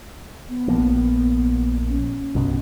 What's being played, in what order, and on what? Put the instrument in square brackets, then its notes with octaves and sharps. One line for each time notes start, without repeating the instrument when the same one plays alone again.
[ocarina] B3
[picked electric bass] A#1 F3 A#3
[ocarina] C#4
[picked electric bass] C2 G2 B2